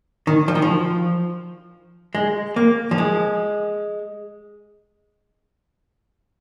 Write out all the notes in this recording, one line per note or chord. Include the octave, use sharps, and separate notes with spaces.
D#3
F3
D#3
F3
G#3
A#3
F3
G#3